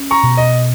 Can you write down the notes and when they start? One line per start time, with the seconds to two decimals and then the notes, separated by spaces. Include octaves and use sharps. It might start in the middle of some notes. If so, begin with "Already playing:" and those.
Already playing: C#4
0.11 A#5 C#6
0.23 B2
0.37 D#5